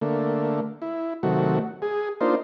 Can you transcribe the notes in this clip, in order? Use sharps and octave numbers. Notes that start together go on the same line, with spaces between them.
D3 A3 A#3
E4
C3 D#3 F#3 A3 F#4
G#4
A#3 D4 D#4 F4 C5